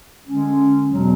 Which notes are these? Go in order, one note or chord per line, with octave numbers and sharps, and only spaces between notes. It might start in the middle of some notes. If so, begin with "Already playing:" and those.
D3 G#3 C#4
E2 B2 F#3